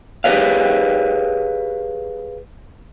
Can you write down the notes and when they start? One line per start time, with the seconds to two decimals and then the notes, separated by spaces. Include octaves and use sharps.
0.24 G4 G#4 B4 C#5 F5